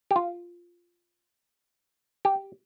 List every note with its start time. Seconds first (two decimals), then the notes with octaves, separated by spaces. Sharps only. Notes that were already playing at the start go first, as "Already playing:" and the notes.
0.11 G4
0.16 F4
2.25 G4